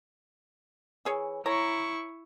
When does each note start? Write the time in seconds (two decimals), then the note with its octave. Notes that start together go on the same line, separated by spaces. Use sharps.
1.05 E3 G#4 C#5
1.46 E4 C#5 A#5 C#6